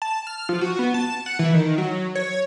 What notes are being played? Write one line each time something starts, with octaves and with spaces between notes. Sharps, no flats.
A5
F6
F3
F#4
B3
A5
F#5
E3
D#3
F#3
C#5